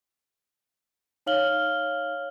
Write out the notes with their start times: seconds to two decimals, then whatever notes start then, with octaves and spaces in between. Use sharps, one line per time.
1.26 D#4 C#5 F5 F6 F#7 G7